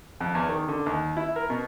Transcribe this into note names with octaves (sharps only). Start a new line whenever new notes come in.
F2
E2
D#3
D3
D#2
E4
A#4
B2